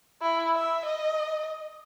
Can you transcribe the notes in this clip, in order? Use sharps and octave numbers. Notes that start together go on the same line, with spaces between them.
E4
E5
D#5